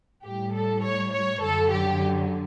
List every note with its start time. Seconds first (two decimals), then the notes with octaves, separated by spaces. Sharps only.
0.24 A2 G3 G4
0.53 A4
0.83 C#5
1.13 C#5
1.42 F#2 D3 F#3 A4
1.72 G4